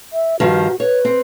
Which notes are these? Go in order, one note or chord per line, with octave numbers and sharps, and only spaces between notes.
E5
G2 D#3 F3 F#4
B4 C#5
C4